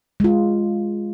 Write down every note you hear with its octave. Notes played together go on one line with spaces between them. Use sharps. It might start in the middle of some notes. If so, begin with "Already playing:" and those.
G#3 F4